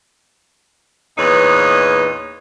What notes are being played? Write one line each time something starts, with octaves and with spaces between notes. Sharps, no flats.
E2 A#2 D#4 B4 C#5